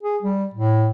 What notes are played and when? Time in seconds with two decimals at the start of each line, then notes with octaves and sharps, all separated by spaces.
0.03 G#4
0.22 G3
0.54 A2